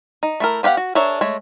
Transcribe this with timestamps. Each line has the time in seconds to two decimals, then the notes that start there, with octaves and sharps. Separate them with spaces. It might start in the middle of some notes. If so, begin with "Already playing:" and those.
0.23 D#4
0.40 A3 E4 A#4
0.63 B3 G4 B4 F5 F#5
0.77 F#4
0.95 D4 G#4 A#4 C#5 E5
1.21 G#3 A3 C#5